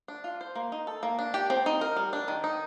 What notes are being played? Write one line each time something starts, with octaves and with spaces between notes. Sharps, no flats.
D4
F4
C5
A#3
D#4
A4
A#3
D4
G4
C4
D#4
A#4
G3
D4
D#3
D#4